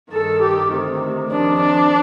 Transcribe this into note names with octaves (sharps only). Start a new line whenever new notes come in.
G2 D#3 A4
G4
D2 C3 D#3
F2 C3 D#3 D4
D4